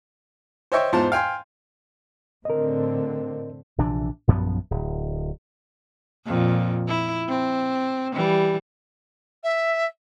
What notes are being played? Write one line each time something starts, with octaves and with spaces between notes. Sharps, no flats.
C5 C#5 D#5 E5 G5 C#6
E2 G#2 F4 C5 A5
F5 G5 G#5 C6
A2 D3 C4 A#4 D#5
A#1 C3 E3 D4
A#1 F#2 F3 B3
D1
F2 A#2
E4
C4
E3 G3
E5